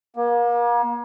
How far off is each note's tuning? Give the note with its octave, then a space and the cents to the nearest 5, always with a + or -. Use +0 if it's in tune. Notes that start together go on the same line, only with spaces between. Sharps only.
A#3 +35